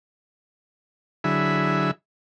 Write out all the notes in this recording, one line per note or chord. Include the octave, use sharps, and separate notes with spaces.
D3 F#3 E4 G#4 E5 B5